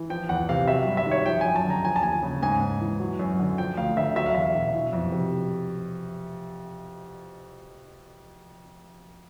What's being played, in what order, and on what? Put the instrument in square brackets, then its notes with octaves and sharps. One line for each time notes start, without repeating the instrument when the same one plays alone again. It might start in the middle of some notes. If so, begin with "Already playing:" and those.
Already playing: [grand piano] E3
F3 G5
E2 F#5
C3 F5
F#3 E5
G2
E5
D#3
C#5
F3 G5
F#2 G#5
A5
D3
A#5
F3 G#5
A5
D#2 G#5
C#3
G#2 G#5
G#2
E3
F#3
F#2
D3
F3 G5
D2 F5
D3 E5
F#3 E5
F5
E2 E5
B2
E3
F2
C3